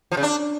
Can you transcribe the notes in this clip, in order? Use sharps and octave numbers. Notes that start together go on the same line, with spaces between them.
F3
C#3
D4